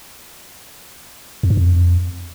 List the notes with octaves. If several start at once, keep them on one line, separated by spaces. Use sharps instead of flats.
F2
G2
F2